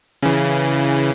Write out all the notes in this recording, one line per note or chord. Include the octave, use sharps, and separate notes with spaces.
C#3 E3